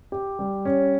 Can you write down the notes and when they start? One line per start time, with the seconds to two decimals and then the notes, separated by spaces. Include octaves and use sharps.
0.12 G4
0.39 G3
0.65 C#4